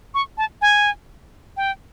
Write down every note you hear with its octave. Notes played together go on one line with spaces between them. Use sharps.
C#6
A5
G#5
G5